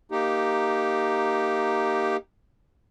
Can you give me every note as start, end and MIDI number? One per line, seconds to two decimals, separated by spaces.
0.11 2.17 58
0.11 2.17 63
0.11 2.17 67